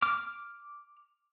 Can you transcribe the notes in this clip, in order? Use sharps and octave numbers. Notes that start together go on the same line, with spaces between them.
D6 F6